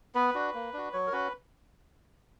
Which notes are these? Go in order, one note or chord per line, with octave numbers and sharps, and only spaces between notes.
B3 B4
D4 F#4
A#3
D4 F#4
F#3 C#5
A#4
C#4 F#4 B4